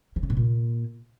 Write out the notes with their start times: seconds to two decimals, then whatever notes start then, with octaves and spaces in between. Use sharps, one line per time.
0.16 D#3
0.23 C#3
0.30 A2
0.37 A#2